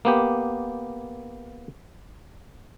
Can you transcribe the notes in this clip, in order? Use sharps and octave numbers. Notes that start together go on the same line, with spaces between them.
A#3 B3 G4